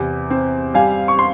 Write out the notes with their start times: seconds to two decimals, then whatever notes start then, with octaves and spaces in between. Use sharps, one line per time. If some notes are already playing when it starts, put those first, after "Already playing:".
Already playing: E2 C3
0.30 C4
0.74 G3 F5 G#5
1.08 C#6
1.19 C6